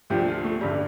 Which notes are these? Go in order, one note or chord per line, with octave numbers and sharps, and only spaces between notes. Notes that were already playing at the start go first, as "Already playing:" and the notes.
D2 D3 F3 G4
F4
A3
A1 G2 D3 G3